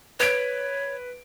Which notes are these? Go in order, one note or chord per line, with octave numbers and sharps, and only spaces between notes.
B4 C#5 D7